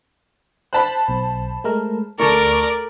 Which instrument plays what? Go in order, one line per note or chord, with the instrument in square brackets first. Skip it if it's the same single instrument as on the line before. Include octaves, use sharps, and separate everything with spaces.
[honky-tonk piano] C5 A5 B5 [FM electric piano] F#6 B6
[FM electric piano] B1
G#3 A3 A#4
[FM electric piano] D2 A5 C#6 [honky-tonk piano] A3 [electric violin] A#4 D5